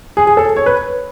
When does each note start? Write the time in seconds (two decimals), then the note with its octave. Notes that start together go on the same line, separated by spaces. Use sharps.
0.17 G#4
0.27 G#4
0.37 A4
0.56 C#5
0.66 B4